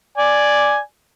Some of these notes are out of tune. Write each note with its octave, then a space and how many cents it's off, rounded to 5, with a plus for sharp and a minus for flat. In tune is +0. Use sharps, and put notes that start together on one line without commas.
D5 +0 G#5 +0